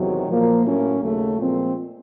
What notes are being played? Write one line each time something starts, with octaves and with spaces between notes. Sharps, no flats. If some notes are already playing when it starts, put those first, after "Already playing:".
Already playing: E2 C3 D#3 F#3
A#2 F3 A#3
A2 F#3 A#3 C#4
D#2 C#3 F#3 A3
A#2 F3 G#3 C4